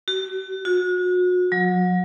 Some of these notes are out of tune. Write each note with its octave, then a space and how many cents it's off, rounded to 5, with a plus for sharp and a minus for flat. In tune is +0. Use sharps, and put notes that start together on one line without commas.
F#4 +35
F#4 -35
F#3 -35